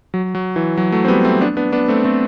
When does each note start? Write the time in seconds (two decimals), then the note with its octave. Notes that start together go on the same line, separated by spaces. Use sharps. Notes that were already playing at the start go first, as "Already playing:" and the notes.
0.14 F#3
0.35 F#3
0.56 E3
0.77 F#3
0.92 F#3 A3
1.05 C4
1.08 G3 B3
1.24 A3 C4
1.41 B3 D4
1.57 B3 D4
1.72 B3 D4
1.88 A3 C4
2.04 A3 C4